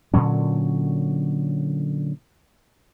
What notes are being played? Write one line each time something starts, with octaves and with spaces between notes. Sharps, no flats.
A#2 D3 F#3 C#4